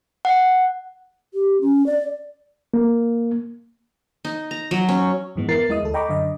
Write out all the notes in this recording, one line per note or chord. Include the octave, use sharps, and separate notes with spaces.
F#5
G4
C#4
D5
A#3
D#4
A#5
F#3
C#4
F2 G#2 E3 G#3 B3
B3 E4 A#4 A6 C7
E2 G#3 E4 D#5 D#6
D2 A4
D#5 G5 A#5 B5 C#6 D6
F#2 D3 D#5